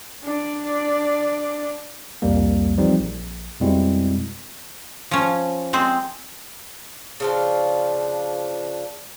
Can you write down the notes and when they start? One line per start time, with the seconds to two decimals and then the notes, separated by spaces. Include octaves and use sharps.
0.23 D4 D5
2.22 C2 F2 G3 A#3
2.77 E3 F3 G3 C4 D#4
3.00 A#1
3.61 F2 B2 G3 G#3 C4 E4
5.11 F3 C#4
5.73 G#3 C4 C5
7.20 C#3 F3 D4